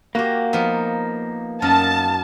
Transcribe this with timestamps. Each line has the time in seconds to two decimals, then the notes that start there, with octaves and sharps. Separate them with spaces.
0.15 A#3 F#4 G4
0.53 F3 B3 D#4
1.62 F#2 D#4 A#4 A5